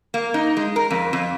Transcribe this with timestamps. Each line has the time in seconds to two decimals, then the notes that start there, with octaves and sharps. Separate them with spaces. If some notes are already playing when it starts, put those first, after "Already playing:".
0.14 A#3
0.34 D#4
0.57 G#3
0.76 A#4
0.91 F2
1.13 F2